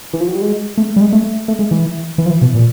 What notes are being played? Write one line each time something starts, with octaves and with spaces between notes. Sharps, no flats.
E3
F3
F#3
G3
G#3
A3
G3
G#3
A3
A3
G#3
E3
E3
F3
E3
B2
A#2